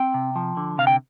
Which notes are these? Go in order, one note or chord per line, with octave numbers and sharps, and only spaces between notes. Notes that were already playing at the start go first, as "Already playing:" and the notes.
Already playing: C4 G5
C3
F3
D3
C3 F5
G5